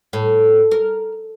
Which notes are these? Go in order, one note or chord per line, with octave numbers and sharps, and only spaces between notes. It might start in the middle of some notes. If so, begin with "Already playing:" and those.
A2
A#4